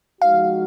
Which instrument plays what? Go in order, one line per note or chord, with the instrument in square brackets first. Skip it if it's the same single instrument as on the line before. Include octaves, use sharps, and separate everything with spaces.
[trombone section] F3 G#3 D#4 F#4 [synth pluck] F5